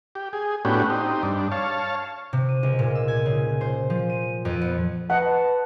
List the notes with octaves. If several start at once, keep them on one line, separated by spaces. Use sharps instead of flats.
G4
G#4
A2 B3 C#4 D4 F#4 G4
C4 D#4 G4
G2 D4
C#5 F5 A5
C3
D#7
C#2
A#2
E6
G#5
C#3
C5
F3
D#7
F2
B3
B4 D#5 F#5 A5